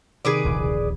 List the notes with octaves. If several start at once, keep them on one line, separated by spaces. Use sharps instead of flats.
C3 D#3 G#4 B4 D5 C7
D1 A#1 D#2